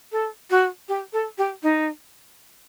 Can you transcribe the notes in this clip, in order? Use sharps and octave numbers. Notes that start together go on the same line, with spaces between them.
A4
F#4
G4
A4
G4
D#4